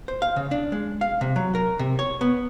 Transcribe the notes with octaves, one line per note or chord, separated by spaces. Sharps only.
C5
F5
C#3
D4
G#3
F5
C3
F#3
A#4
C3
C#5
B3